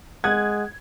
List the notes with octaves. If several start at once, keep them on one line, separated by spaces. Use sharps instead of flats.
G#3 F#5 D#6 F#6 G#6